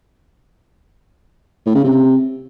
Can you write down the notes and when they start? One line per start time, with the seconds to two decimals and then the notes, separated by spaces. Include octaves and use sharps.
1.66 A2
1.75 C#3
1.83 C3